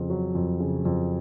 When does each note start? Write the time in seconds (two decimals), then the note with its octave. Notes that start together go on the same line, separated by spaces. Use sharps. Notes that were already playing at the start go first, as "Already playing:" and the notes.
Already playing: F2 C#3
0.10 F#3
0.35 F2
0.60 C#3
0.85 F2